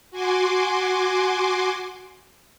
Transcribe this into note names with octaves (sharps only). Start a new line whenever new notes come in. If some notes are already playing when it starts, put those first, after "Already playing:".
F#4 G#5 C6 D6